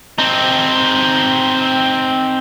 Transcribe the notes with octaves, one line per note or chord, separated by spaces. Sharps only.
C4 D#4